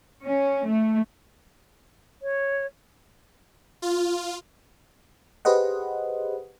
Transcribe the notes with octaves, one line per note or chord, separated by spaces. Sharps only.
C#4
A3
C#5
F4
G4 G#4 B4 C5 D#5 F#5